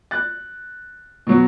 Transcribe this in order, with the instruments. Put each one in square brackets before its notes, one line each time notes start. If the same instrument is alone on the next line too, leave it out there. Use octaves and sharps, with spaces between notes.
[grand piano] F#6 A6
B2 F#3